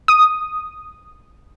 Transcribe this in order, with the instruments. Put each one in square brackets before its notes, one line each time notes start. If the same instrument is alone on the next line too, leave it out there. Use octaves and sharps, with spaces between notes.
[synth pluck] D#6